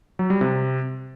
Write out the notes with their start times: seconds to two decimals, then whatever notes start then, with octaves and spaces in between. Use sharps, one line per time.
0.19 F#3
0.30 G3
0.41 C3